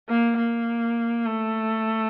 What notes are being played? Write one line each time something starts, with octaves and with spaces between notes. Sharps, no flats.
A#3
A#3
A3